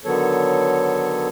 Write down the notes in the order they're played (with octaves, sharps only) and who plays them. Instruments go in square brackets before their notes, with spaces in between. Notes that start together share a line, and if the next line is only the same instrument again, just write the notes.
[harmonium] D3 D#3 F#3 B3 A4 C#5